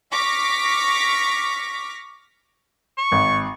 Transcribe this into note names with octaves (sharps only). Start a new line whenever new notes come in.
C#6 D6 F6 A#6 B6
C#6
G#1